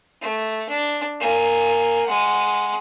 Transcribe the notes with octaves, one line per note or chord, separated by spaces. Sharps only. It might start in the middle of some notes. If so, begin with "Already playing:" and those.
A3
D4
A#3 G#5
G#3 F#5